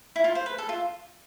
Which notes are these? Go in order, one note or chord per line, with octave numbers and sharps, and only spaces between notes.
E4
F4
C5
B4
A4
F4